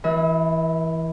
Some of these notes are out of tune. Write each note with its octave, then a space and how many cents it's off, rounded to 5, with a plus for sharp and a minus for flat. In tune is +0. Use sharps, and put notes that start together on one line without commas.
E3 +0 B4 -45 E5 -45